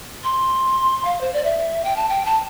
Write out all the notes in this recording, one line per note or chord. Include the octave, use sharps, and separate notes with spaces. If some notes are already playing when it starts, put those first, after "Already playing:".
C6
F5
C5
D5
E5
G5
A5
G5
A5